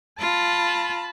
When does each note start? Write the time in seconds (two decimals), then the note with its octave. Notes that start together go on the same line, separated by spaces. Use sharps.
0.19 F4 A5 B5